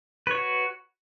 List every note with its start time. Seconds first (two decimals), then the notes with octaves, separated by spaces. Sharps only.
0.27 B4
0.31 C#5
0.35 F#4